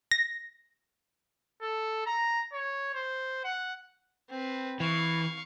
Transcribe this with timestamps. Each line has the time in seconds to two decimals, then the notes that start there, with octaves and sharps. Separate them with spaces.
0.11 A#6
1.62 A4
2.06 A#5
2.53 C#5
2.94 C5
3.44 F#5
4.30 C4 B4
4.80 E3 F5 C#6